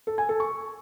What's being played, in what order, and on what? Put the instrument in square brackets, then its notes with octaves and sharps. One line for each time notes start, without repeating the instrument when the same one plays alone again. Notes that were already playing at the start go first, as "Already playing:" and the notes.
[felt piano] A4
G#5
A4
C#6